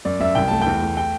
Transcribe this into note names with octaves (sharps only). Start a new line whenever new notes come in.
F#2 D5
F#2 E5
C2 G5
A3 A5
E2 G5
A3
G5